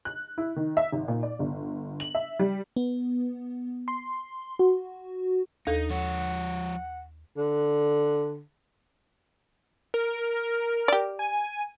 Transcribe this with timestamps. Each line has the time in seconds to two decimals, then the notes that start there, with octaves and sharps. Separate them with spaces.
0.05 F#6
0.38 E4
0.56 D#3
0.77 E5
0.92 G#1
1.08 A#2
1.23 D5
1.39 G1
2.00 F#7
2.15 E5
2.39 G3
2.76 B3
3.88 C6
4.59 F#4
5.67 D#2 D#4 A4
5.90 F3 C#5 F#5
7.37 D3
9.94 A#4
10.88 G4 D5
11.19 G#5